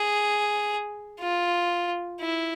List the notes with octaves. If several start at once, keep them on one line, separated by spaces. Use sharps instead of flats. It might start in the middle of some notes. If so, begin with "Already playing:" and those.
Already playing: G#4
F4
E4